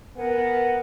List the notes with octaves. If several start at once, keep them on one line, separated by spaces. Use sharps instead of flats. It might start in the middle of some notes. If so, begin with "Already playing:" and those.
B3 A#4 F#5 G#5